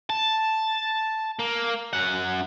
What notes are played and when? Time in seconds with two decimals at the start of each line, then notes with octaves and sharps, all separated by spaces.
0.10 A5
1.39 A#3
1.93 F#2 F#5